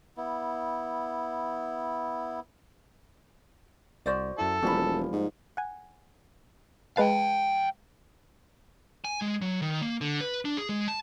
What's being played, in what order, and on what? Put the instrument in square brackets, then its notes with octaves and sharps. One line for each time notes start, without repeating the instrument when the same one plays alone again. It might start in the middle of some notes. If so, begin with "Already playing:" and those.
[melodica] B3 E4
[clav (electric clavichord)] C2 [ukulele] F#4 C5 D5
[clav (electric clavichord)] F#2 E4 [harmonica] A4
[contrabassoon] E1 [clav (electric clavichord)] F3 G3 A#3 [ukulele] C#4 B5
[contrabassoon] G#2
[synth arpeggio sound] F#5 G#5
[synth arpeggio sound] G#3 B4 A5 [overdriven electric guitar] F5 G5
[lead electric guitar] G#5
G#3
F#3
D#3
A#3
D3
B4
D4
G#4
G#3
A5